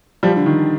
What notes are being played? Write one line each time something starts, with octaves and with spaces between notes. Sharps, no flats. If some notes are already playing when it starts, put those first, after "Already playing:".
F3 G3
D3
D#3